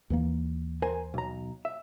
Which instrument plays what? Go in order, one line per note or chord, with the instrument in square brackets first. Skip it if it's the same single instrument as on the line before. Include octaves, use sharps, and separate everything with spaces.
[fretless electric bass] D#2 E3 A#3
[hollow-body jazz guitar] A#4 C5 G#5
B1 A#5
E5